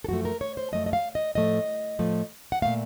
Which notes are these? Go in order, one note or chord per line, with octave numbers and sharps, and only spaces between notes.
A4
F#2 F3 A3 F#4
A#4
C#5
C5
F#2 F3 A3 D#5
D#5
F5
D#5
A2 F3 A3 D#5
A2 F3 A3
F#5
A#2 F3 A3 F5